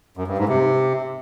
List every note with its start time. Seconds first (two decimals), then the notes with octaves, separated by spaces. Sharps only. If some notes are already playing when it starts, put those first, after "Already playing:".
0.17 F#2
0.28 G2
0.38 G#2
0.48 C3